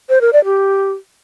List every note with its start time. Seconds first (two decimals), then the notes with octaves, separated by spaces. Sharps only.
0.09 C5
0.21 A#4
0.33 D5
0.45 G4